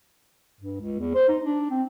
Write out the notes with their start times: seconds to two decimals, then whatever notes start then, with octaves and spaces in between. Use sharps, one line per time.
0.61 G2
0.81 C#2
0.99 E2
1.15 C5
1.29 D#4
1.45 D4
1.70 C4